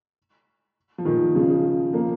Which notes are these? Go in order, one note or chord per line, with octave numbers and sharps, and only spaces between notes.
F3
A#2 D#3
C#3 F3
F3 A#3